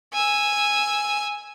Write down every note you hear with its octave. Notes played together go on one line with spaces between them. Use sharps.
G#5 E6